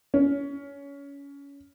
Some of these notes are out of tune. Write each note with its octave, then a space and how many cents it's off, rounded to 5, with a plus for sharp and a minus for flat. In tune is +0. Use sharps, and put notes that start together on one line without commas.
C#4 +25